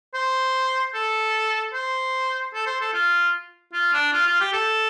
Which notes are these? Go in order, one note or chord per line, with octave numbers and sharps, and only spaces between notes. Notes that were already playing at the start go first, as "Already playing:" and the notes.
C5
A4
C5
A4
C5
A4
F4
F4
D4
F4
F4
G4
A4